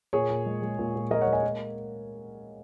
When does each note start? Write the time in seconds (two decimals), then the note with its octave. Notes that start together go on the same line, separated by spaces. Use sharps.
0.13 A#2 G#4 C#5
0.30 A#2
0.46 G#3
0.62 G#3
0.79 A#2
0.95 A#2
1.11 G#3 A#4 D#5
1.22 C#5 F#5
1.27 G#3
1.33 D#5 G#5
1.43 A#3